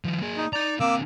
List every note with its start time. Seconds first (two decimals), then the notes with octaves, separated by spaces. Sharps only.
0.05 D#3 F3
0.22 A#3 G#4
0.37 D#4
0.53 D#4 D5 A#5
0.80 D3 A#3 C4 D6 E6